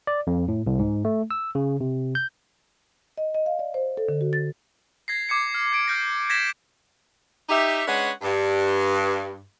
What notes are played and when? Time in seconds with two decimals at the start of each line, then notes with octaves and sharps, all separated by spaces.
0.07 D5
0.27 F2
0.48 A2
0.67 C2
0.79 G#2
1.05 A3
1.31 E6
1.55 C#3
1.81 C3
2.15 G6
3.18 D#5
3.34 D#5
3.46 F5
3.59 D5
3.74 C5
3.97 A4
4.09 D3
4.21 F#4
4.33 A6
5.08 G#6 A#6 C7
5.29 D6 G#6 C7 C#7
5.54 F6
5.73 G#6 D7
5.87 F6 G6 A#6
6.30 G#6 A#6 B6 E7
7.49 D#4 G4 E5
7.86 G#3 C#4 D4 B4 C#5 F#5
8.22 G2